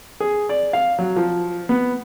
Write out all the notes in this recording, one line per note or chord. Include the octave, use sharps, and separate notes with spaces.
G#4
D5
F5
F#3
F3
B3